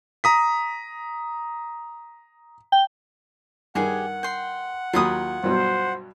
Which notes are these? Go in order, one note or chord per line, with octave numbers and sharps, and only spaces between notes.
A#5 D#6 B6
G5
G2 D#3 G4 G#4 F#5 G#5
G5 C6
D#2 F#3 F4 B5 D#6
G2 B2 F#3 C5